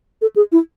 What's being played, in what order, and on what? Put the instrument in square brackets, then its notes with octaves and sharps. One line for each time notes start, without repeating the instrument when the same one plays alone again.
[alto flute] A4
G#4
E4